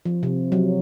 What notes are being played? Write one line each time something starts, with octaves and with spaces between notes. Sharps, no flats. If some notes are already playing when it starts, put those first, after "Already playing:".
F3
C3
F#3